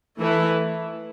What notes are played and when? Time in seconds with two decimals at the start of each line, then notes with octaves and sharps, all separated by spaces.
0.18 E3 A3 E4 B4